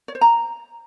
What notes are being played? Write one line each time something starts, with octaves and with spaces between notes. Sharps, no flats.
C#5
C5
A#5